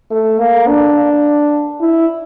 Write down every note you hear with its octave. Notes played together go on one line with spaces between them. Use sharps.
A3
A#3
D4
E4